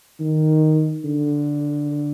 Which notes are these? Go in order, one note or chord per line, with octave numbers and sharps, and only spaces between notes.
D#3
D3